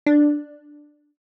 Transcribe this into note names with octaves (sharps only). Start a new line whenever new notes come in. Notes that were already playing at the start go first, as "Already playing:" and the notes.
D4